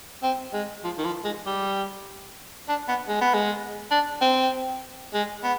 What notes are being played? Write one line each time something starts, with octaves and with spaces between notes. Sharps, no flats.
C4
G#3
F3
D#3
F3
G#3
G3
D4
B3
G#3
B3
G#3
D4
C4
G#3
B3